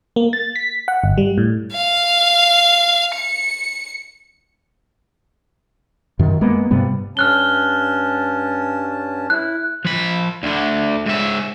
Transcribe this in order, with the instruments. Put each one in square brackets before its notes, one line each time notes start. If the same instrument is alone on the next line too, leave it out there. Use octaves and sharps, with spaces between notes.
[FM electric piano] A#3
A6
B6
F#5
G1
G3
A2
[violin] F5
C#7
[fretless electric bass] F#2 D#3
G#3 A#3 B3
G2 C3 G3 B3
[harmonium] G2 C#4 A5 [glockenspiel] F6 F#6 G7
[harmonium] E4 [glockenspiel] F#6
[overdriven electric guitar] F3 B5
D2 D3
G#2 E5